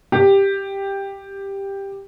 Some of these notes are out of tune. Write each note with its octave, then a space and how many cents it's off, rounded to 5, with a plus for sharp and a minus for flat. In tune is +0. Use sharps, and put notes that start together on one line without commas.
G4 +5